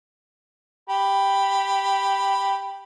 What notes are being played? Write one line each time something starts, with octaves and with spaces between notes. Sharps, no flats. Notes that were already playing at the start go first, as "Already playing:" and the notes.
G4 B5